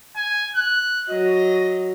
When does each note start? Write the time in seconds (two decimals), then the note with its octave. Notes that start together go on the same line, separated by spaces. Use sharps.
0.16 G#5
0.55 F#6
1.10 F#3 D#5